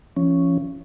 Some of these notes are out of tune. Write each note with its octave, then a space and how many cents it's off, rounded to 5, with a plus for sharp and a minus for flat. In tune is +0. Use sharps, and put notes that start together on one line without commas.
F3 -35 C#4 +0